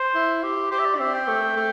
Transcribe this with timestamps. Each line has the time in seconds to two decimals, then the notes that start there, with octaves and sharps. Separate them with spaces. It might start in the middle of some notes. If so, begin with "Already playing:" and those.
Already playing: C5
0.15 E4
0.43 G4
0.71 G4 C5
0.79 E5
0.86 D5
0.95 D4
0.99 C4 E5
1.14 G5
1.28 A3
1.57 A3